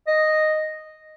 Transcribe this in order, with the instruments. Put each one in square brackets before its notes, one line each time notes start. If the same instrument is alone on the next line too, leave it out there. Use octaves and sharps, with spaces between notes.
[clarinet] D#5